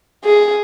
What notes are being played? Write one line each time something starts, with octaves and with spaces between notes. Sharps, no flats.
G#4